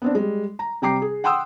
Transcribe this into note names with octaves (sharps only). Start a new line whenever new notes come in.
B3 C4 D4
G3 G#3
A#5
C3 G3 G5 A#5 D6 C7
G#4
F#5 G5 C6 D#6 E6